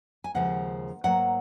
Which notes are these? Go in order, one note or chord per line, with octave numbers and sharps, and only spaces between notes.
G#5
D#2 C#3 F3 G#3 F#5
G#2 F#3 A#3 F#5